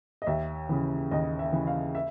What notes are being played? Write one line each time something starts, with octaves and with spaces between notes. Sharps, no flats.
D#5
D#2 E5
C#3 E3
D#2 D#5
E5
C#3 E3
F5
E5